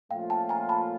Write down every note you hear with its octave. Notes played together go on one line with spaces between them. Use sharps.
A#2 F3 A3 C#4 F4 F5 G5
G5 A5
G#5 A#5
A5 B5